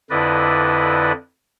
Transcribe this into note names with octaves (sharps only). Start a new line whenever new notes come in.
F2 D3 E4 B4 D5 D#5